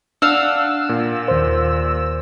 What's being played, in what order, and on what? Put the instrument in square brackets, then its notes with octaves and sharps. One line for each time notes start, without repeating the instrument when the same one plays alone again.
[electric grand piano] D4 [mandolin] F5 F#5 [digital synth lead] E6
[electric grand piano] A#2
[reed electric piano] D#2 C5